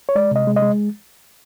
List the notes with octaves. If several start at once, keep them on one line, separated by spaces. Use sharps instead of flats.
C#5
G#3 D5
C3 D#5
G#3
D#5
G#3